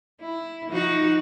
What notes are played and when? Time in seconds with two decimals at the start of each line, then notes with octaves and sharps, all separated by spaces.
0.22 E4
0.69 F3 D#4 F#4